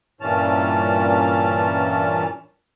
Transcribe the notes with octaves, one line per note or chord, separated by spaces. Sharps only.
G2 A#2 E3 C#4 A5 F6